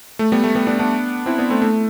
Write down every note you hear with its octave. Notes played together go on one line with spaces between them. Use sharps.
A3
G3 B3
A3
G3 B3
B3 D4
B3 D4
C4 E4
B3 D4
A3 C4
A3